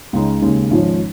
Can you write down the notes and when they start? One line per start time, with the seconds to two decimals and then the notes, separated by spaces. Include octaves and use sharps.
0.13 C#2 C#3 G#3 D#4
0.42 D#2 C#3 G#3
0.71 G#1 G#2 F3 G#3 C#4